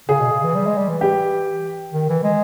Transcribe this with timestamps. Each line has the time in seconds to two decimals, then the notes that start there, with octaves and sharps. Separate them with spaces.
0.09 C#3 G#4
0.21 B2
0.32 C#3
0.43 E3
0.55 G3
0.66 G#3
0.77 G3
0.89 E3
1.01 G4
1.93 D#3
2.09 E3
2.23 G#3